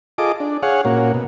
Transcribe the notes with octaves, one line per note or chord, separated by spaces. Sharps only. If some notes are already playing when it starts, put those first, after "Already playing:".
F4 G#4 A4 D#5 D6
D4
G#4 C#5 F5 F#5
A#2 A#3 C#4 F#4
B2